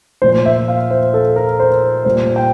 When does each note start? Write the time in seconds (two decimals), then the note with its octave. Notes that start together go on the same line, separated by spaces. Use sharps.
0.22 A#2 F3 C5
0.46 E5
0.68 F5
0.91 C5
1.14 A4
1.36 A#4
1.60 C5
2.05 A#2 G3 C5
2.36 G5